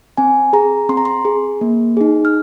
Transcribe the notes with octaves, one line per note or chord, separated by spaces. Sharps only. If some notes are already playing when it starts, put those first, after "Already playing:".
C4 G#5
G#4 A#5
C4 C6
A#5
C6
G#4
A#3
D#4 G#4
F6